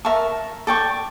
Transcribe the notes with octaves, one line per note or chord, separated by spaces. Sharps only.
A#4 E5 A5 C#6
A4 D5 G5 C#6